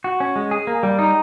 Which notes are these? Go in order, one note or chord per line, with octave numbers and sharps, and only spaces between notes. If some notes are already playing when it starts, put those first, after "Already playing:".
F#4
C#4
G#3
G#4
A#3
G3
D#4